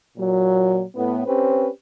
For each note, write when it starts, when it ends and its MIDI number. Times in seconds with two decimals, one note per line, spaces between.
0.18 0.83 46
0.18 0.83 54
0.96 1.25 45
0.96 1.25 59
1.27 1.68 60
1.27 1.68 61
1.27 1.68 67
1.27 1.68 71
1.27 1.68 72